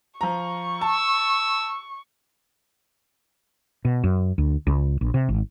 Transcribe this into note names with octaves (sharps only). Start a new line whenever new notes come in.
F3 A#5 C#6
A5 E6
B2
F#2
D2
C#2
A#1
C3
G#1